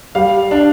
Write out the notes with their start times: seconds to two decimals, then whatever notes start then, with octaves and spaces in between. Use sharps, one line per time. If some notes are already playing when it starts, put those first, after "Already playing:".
0.15 G3 F5
0.51 D4